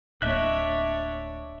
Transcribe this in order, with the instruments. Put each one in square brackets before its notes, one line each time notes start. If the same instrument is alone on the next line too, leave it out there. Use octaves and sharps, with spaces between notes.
[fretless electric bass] D1 A#3 [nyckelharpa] D4 C#5 [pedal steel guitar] D#5 E5 F#6